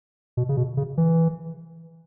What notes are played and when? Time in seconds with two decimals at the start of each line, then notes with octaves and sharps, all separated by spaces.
0.37 B2
0.49 C#3
0.57 B2
0.77 C#3
0.97 E3